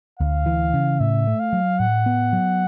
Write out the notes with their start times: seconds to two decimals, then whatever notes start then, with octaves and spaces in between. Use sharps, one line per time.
0.19 D2 F5
0.46 E3
0.74 C#3
1.00 A2 E5
1.27 A3
1.40 F5
1.53 F#3
1.79 A2 F#5
2.06 B3
2.33 F#3